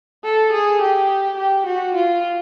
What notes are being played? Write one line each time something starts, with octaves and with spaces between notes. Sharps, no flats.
A4
G#4
G4
G4
F#4
F4